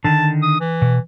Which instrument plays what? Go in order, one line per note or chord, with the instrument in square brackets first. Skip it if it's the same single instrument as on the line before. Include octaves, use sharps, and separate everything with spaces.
[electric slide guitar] D3 D#3 [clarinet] A5
[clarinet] D#6
E3
[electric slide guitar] B2